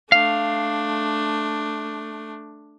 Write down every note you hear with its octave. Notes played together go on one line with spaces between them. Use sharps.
A3 D4 F5